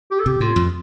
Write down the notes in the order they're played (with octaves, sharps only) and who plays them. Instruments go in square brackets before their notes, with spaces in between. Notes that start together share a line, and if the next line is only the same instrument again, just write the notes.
[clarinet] G4
A4
[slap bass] C3 [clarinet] G4
[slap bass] A2 [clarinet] F4
[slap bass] F2